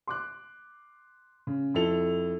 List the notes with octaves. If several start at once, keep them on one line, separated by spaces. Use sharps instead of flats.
C6 D6 F#6
C#3
F2 E4 A4 F7